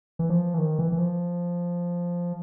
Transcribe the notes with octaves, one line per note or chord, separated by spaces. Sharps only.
E3
F3
E3
D#3
E3
E3
F3